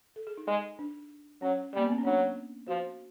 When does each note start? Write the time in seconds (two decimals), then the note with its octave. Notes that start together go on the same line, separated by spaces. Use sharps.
0.16 A4
0.27 G#4
0.37 D#4
0.47 G#3
0.79 D4
1.42 F#3 C#4
1.74 G3 A#3
1.84 B3
1.91 C4
1.98 C#4
2.04 F#3 D4
2.68 F3 F#4